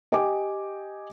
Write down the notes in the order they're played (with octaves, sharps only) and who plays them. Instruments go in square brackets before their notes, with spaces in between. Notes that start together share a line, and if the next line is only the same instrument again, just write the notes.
[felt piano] G4 D#5 G5 G#5 D6